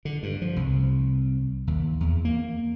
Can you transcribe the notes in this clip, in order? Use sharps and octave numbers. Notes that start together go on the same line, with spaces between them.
D3
G2
F3
C2
D#2
E2
A#3